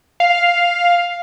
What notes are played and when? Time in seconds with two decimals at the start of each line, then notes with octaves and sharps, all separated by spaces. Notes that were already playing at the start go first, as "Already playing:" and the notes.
0.20 F5